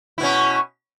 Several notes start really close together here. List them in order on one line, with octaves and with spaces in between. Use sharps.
E4 B2 C#4